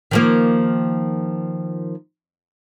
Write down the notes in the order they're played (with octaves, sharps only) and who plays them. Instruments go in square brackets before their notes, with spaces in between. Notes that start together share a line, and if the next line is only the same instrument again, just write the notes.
[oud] D#3 F3 A#3